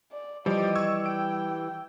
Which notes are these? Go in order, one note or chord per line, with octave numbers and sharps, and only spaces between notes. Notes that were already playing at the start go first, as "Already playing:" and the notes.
D5
E3 F3 G3 G4 D5 D#5
C#6 E6 G#6
G5 D7